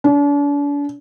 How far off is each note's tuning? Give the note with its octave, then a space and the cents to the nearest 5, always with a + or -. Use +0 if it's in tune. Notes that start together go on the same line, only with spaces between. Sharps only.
D4 -40